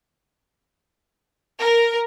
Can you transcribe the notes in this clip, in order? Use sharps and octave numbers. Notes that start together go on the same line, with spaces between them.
A#4